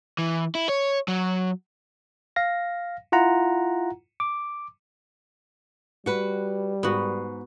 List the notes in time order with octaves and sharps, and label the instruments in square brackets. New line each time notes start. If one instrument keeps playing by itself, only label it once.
[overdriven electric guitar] E3
E4
C#5
F#3
[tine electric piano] F5 A#6
E4 F4 F#5 A#5
D6
[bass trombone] G3 [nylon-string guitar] F#4 B4
[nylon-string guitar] G#2 [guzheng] B3 F#4